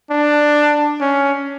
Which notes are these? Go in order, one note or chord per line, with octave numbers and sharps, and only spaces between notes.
D4
C#4